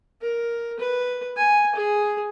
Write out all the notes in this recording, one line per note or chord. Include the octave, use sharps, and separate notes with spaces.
A#4
B4
G#5
G#4